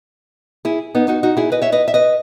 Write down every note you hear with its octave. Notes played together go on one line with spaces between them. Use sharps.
E4 G#4
B3 D#4
D#4 F#4
D#4 F#4
E4 G#4
B4 D#5
C#5 E5
B4 D#5
E5
B4 D#5